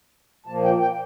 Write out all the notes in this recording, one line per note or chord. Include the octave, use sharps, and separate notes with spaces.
A#2 F3 A#3 A5
G5
G5